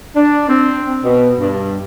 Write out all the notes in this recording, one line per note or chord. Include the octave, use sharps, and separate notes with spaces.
D4
C4
B2
G2